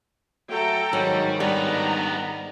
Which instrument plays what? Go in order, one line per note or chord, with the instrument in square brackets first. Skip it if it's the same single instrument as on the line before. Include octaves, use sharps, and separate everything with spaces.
[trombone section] F#3 A3 [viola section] A4 G5 A#5
[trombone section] G#2 D#3 [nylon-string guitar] F#3 [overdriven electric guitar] G3
[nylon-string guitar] G3 [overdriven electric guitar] B3 D4 [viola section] A#5